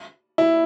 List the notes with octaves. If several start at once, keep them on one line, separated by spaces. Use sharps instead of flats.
E4